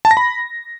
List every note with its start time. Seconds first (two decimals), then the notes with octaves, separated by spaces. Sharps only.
0.05 A5
0.11 A#6
0.17 B5